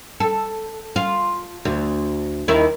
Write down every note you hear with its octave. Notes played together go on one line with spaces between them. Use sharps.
A4
F4
D2
D#2 D#3 E4